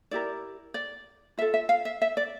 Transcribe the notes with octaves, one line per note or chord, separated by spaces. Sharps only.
E4 G4 A#4 D5
D5
F4 A4 E5
E5
F5
E5
E5
D5